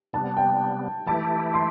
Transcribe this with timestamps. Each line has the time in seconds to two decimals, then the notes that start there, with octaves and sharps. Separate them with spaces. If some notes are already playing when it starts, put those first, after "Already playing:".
0.13 C3 G3 B3 A5
0.37 G5
1.06 E3 A3 E4 G4 A5
1.54 C6